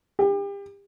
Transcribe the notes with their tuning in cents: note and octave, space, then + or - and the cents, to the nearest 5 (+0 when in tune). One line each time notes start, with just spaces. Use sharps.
G4 +35